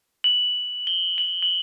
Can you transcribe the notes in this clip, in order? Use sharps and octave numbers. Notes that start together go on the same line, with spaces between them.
F#7
G7
F#7
F#7